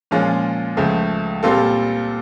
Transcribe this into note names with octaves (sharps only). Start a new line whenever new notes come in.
A#2 F3 G#3 C#4 F4
C#2 C#3 F3 A3
A#2 G3 C4 F4 A4